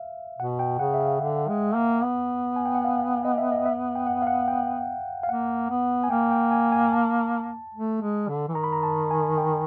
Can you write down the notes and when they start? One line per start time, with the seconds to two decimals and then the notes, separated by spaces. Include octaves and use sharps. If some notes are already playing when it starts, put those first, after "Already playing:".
Already playing: E5 F5
0.39 B2 F#5
0.59 G5
0.79 C#3 F#5
0.94 E5
1.00 F5
1.21 D3
1.49 G#3
1.75 A#3
2.02 B3
2.56 G#5
2.66 G5
2.75 F#5
2.84 F5
3.25 D#5
3.38 E5
3.52 D#5
3.66 E5
3.95 G5
4.07 F#5
4.22 F5
4.27 F#5
4.48 G5
5.23 F5
5.29 A#3 F#5
5.70 B3
6.04 G#5
6.10 A#3 G5
6.31 G5
6.51 G#5
6.72 G#5
6.92 A5
7.75 A3
8.01 G#3
8.29 D3
8.48 E3
8.55 D#3 A#5
8.64 B5
8.73 A#5
8.83 A5
9.11 G#5
9.38 G5